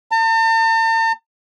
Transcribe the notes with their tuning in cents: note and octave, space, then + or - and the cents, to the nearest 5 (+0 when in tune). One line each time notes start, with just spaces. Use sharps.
A5 +45